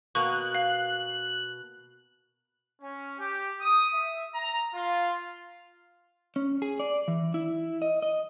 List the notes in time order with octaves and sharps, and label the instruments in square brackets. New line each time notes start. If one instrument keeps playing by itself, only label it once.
[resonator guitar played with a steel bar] B2 A#3 [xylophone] C#6 [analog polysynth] F#6
[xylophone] F5
[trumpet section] C#4
G4
D#6
E5
A#5
F4
[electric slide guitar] C#4
G#4
D5
E3
E4
D#5
D#5